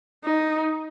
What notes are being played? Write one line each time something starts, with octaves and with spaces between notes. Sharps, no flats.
D#4